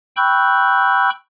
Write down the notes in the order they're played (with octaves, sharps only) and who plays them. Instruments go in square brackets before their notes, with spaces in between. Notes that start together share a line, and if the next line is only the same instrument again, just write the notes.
[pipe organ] G5 B5 C#6 E6 F#6 G6